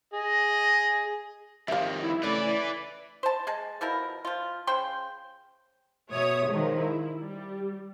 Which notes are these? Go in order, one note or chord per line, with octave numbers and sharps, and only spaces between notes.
G#4 D#5
F2 D#3 G3 G4 E5 F5
E4
C#3 E3 A3 E4 B4 D5
C5 A5
G#3 G#4 A5
B2 F3 E4 A#4
F3 F4
C#3 C5 G5 C6
B2 C#5 E5 D#6
D#3 F3 G#3
E4
G3